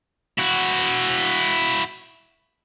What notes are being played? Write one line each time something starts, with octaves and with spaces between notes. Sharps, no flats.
E4 F#4